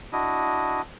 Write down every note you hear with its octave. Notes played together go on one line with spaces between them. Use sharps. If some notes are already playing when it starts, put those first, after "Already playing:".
D4 E4 F#4 D#5